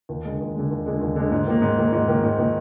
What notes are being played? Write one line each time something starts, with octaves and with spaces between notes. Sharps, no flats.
D#2
D3 G#3
D#2
D3 G#3
D#2
D3 G#3
D#2
D3 G#3
G#2
D#3 A#3
G#2
D#3 A#3
G#2
D#3 A#3
G#2
D#3 A#3